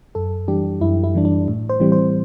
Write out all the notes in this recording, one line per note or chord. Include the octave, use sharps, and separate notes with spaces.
F#2 A4
E3 G3 D4 G4
F#2 E4
E4
E3 G3 D4
D4
A2
C5
E3 G3 C4
C5